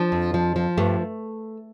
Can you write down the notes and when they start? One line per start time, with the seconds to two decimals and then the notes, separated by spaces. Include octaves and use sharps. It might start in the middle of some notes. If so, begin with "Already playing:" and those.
Already playing: F3 D4
0.12 F2
0.34 F3
0.56 F3
0.78 G2 A3